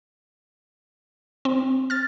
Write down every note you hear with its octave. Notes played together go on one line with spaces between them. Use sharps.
C4
F6 A6